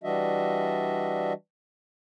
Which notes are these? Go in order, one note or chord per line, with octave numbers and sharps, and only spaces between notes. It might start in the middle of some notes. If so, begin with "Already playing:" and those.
E3 G3 D4 F#4 D#5 E5